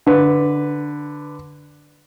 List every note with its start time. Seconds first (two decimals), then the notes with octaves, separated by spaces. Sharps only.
0.07 D3 B4